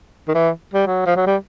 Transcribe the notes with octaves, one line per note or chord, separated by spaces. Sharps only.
D#3
E3
G3
F#3
F3
F#3
G3